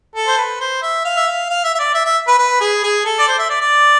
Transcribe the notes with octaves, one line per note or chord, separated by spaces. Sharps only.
A4
C5
B4
C5
E5
F5
E5
F5
F5
E5
E5
D5
E5
E5
B4
B4
G#4
G#4
A4
D5
C5
E5
D5
D5